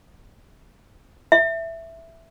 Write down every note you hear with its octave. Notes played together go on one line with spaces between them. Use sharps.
E5